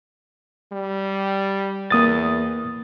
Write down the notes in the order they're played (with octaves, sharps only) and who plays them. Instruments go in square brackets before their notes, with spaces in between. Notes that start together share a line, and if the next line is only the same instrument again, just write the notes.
[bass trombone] G3
[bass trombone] E2 [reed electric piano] A#3 D#6 A6